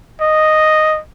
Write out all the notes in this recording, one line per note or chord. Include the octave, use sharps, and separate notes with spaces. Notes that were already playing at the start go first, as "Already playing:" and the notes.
D#5